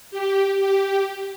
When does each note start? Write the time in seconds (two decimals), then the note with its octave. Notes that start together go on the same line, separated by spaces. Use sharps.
0.11 G4
0.60 G4